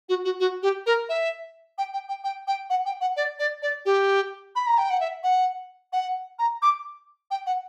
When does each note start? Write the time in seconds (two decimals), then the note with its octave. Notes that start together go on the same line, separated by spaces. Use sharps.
0.09 F#4
0.25 F#4
0.40 F#4
0.63 G4
0.86 A#4
1.09 E5
1.78 G5
1.93 G5
2.09 G5
2.24 G5
2.47 G5
2.70 F#5
2.86 G5
3.01 F#5
3.16 D5
3.39 D5
3.62 D5
3.85 G4
4.56 B5
4.67 A#5
4.78 G5
4.90 F#5
5.00 E5
5.24 F#5
5.93 F#5
6.39 A#5
6.62 D6
7.31 G5
7.46 F#5